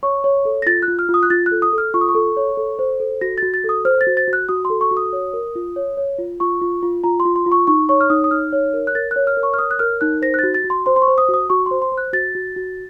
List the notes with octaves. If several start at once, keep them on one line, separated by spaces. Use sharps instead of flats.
C#5 C#6
C#5
A4
A#6
F4 A6
F#6
F4
F6
F4
D#6
F#6
F4 A6
F#6
A4
D#6
A4
F6
F4 C#6
D#6
C#6
A4
C#5
A4
C5
A4
F#4 A#6
F#4 A6
A6
A4
D#6
C5 F6
A6
F#4
A6
F#4
F#6
F#4 D#6
C6
A4
C#6
F#4
D#6
C#5
A#4
F4
C#5
C#5
F4
F4 C#6
F4
F4
F4 A#5
C6
F4
C6
F4
C#6
D#4 C#6
C#5 C#6
F6
D#4 D#6
D#6
D#4 F6
C#5
A#4
F#6
A#4 A6
F#6
C#5
F6
A#4
C#6
F6
C#5 D#6
F#6
A#4 F6
D#4 F#6
C5 A#6
F#6
F#4 A6
A6
F#4
C6
C5 C6
C6
C#6
C5
D#6
F#4
D#6
F#4 C#6
C5 C6
C6
C5
F#6
F#4 A6
F#4
F#4